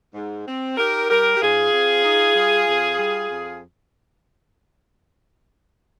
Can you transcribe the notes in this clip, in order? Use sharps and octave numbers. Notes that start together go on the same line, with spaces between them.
G#2
C4
D#4 G4 A#4
G3 G4 A#4
G4
G#2 F4 G#4
C4
D#4
G3
F2
G3
F2